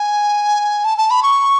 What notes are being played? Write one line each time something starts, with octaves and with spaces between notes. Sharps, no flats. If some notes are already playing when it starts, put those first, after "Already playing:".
Already playing: G#5
A5
A5
B5
C#6